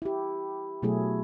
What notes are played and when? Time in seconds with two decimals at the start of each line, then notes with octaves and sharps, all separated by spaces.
0.02 E4 G4
0.83 B2 F#3 A3 E4 G#4